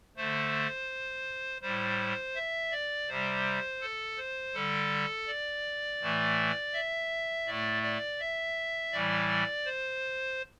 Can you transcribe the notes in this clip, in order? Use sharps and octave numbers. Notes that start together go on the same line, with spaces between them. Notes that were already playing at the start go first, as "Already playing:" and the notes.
D3 A3 C5
A2 G3 C5
E5
D5
C3 G3 C5
A4
C5
D3 G3 A4
D5
A2 E3 A3
E5
A2 A3 D5
D5
E5
A2 E3 G3 D5
C5